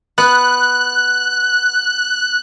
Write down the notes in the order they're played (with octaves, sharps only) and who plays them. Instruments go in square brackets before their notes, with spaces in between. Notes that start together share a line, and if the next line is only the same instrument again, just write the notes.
[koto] B3 [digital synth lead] F#6